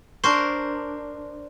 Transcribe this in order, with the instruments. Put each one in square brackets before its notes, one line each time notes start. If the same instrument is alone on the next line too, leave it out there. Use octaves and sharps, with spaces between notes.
[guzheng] D4 A#4 C5 [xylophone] C6 C#6